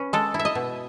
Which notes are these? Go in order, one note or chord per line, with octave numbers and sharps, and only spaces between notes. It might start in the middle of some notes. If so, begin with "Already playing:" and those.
Already playing: C#4 B4
G#3 A4
E4
E5
D#5
B2